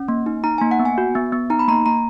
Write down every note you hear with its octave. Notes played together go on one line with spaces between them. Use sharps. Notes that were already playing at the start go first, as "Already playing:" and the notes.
Already playing: C#4
A#3
D#4
D#4 A#5
A#3 G#5
F#5
B3
G#5
F#4
B3
B3
D#4 A#5
B5
A#3 A#5
A#3 A#5